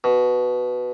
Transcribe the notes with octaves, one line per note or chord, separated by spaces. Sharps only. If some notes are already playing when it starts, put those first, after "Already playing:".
B2